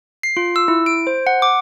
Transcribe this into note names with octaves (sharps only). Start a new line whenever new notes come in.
C7
F4
E6
E4
D7
C5
F#5
D6